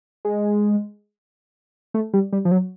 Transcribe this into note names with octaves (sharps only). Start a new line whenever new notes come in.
G#3
A3
G3
G3
F3
F#3